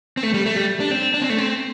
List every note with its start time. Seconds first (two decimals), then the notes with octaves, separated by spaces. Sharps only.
0.17 C4
0.23 A3
0.34 G3
0.46 A3
0.57 G3
0.80 D4
0.91 C4
1.14 D4
1.22 C4
1.30 A3
1.38 C4